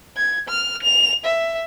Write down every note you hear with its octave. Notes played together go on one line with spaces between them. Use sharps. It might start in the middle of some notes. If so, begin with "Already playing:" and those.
G#6
F6
F7
E5